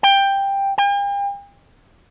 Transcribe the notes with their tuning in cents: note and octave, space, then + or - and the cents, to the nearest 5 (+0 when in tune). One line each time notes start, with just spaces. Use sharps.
G5 +10
G5 +45